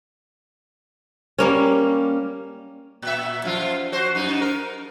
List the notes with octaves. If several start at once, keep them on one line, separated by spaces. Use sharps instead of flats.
G3 A#3 C#4
A#2 E5
F#2 F3 F4
F#4 C5
F#2 D#4
A#4